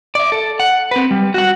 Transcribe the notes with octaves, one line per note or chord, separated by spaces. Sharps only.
D5 E5
A4
F#5
C4 B4
G3
F#4 F#5